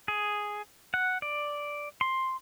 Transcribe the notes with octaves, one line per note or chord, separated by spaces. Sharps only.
G#4
F#5
D5
C6